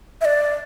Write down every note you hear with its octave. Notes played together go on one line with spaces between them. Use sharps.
E5
D5